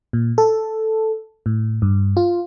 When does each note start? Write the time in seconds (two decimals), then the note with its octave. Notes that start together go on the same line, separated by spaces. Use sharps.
0.13 A#2
0.38 A4
1.46 A2
1.82 G2
2.17 F4